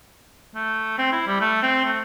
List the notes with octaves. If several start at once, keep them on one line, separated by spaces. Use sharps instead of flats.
A3
C4
E4
G3
A3
C4
A3